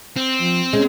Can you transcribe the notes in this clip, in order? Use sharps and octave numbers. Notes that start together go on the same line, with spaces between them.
C4
F3
G#3 C#4